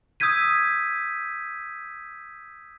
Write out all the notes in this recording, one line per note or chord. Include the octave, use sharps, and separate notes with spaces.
D#6 E6 G6 G#6 B6 D#7